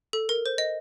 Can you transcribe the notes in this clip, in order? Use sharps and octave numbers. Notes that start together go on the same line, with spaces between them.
A4
A#4
C5
D#5